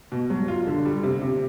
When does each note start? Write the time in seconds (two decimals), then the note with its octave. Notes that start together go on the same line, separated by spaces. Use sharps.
0.12 B2
0.30 F#3
0.48 F4
0.67 D3
0.85 G3
1.03 C3
1.22 C3